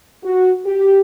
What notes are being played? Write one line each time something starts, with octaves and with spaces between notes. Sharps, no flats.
F#4
G4